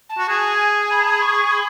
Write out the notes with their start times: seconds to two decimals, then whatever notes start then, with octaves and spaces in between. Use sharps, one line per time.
0.09 A5
0.18 F#4
0.29 G#4 G#5
0.90 B5
1.00 A5
1.10 B5
1.21 C#6
1.51 B5